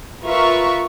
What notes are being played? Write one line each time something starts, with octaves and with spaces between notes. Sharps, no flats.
F4 A#4 B4 E5 F5 C#6